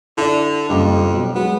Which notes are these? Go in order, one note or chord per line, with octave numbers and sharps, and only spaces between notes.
D3 E4 D5
F#1 F2 G3 D6
B2 F#3
F#3 G#3 B3